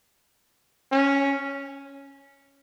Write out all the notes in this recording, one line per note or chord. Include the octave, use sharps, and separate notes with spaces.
C#4